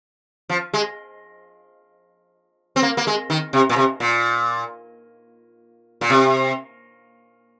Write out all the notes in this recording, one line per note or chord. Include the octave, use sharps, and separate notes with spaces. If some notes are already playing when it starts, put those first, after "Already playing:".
F3
G#3
C4
A#3
A#3
G#3
D#3
C3
A#2
C3
A#2
A#2
C3